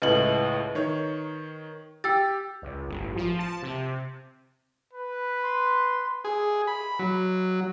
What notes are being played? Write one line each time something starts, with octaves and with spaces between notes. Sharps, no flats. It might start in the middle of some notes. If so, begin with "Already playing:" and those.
C#2 A2 B4 D#5 F#7
D#3 C#5
G4 G5 E6 A6
C#2
G1
A1
F3
A5
C3
B4
C6
G#4
B5
F#3